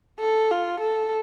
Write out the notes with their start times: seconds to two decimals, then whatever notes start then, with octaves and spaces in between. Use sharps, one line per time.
0.19 A4
0.51 F4
0.81 A4